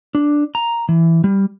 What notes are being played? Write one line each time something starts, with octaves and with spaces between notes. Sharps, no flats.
D4
A#5
E3
G3